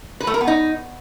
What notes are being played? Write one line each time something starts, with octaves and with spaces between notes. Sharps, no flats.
B4
A3
A#4
B3
D#4